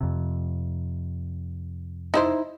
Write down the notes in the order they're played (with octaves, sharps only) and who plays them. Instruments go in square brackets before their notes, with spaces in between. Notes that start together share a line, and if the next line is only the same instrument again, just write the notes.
[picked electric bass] F2 C3
[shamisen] D#4 E4 C5